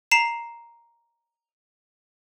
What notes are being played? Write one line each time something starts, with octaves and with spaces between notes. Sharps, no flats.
A#5 C7 E7